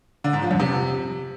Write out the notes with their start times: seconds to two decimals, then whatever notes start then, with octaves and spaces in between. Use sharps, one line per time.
0.24 D3
0.33 G#2
0.42 F3
0.51 F2
0.60 C3